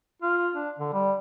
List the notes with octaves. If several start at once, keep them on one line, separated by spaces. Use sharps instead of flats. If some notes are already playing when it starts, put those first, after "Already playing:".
F4
D4
D3
G3